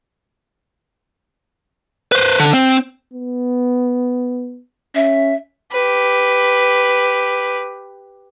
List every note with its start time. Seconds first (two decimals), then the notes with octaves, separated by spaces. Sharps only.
2.12 B4 C5
2.40 D3
2.54 C4
3.13 B3
4.95 C#4 E5
5.72 G4 B4